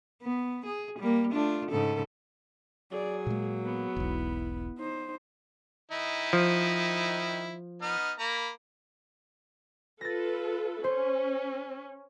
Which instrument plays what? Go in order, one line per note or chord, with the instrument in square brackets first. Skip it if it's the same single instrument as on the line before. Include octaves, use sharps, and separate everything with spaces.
[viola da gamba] B3
G#4
G3 A#3
A3 D4 F4
G#2 C#3 A4
[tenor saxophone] F#3 [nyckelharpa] G#4 [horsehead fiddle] D5
[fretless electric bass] A#2 G#3 [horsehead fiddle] A#3
[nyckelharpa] B3
[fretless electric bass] E1 B1 [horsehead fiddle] E4
[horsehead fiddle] D#4 C5
[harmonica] D#3 D#4 E4
[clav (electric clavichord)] F3
[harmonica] B3 D#4 F6
A#3 A#5 B5
[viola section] F4 A4 B4 [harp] A6 A#6
[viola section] C#4 [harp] C5